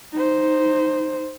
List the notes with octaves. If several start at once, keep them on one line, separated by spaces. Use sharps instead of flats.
D#4 C5